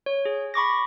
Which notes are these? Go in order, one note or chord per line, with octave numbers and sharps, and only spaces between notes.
C#5
G#4
B5 C#6 D6 A#6